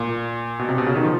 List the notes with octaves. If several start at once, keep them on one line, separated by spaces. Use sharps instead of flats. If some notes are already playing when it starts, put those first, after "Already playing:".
Already playing: A#2
B2
C3
B2
C#3
D#3
F3